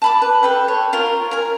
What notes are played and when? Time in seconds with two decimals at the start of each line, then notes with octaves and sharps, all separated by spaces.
0.02 A5 B5 D6
0.22 B4
0.43 A4 B4 G5
0.68 C#5
0.93 F4 A#4 C#5
1.31 A#4 G#5